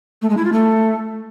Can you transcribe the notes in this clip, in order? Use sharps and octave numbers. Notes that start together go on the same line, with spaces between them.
A3
G#3
E4
F4
A3